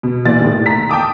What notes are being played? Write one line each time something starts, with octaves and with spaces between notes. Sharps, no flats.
B2
A#2 E3 D5 A6
A2 D#3
A#5 B6
G5 A5 D6 D#6